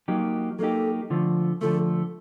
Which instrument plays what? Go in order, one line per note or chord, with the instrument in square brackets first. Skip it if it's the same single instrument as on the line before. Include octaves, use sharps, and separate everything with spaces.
[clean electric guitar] F#3 A#3 D#4 G4
[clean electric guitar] F#3 A#3 D#4 G4 [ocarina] A4
[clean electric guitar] D3 F3 A3
[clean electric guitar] D3 F3 A3 [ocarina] A4